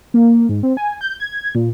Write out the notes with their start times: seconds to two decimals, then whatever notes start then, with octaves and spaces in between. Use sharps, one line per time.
0.14 A#3
0.49 G#2
0.63 C4
0.77 G#5
1.01 G6
1.20 G#6
1.55 A#2